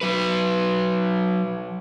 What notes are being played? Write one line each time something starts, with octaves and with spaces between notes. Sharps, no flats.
F#3 B4